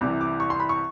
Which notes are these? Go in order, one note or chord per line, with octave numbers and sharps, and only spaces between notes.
C2 C3 E3 D6
D6
C#6
C6
B5
C#6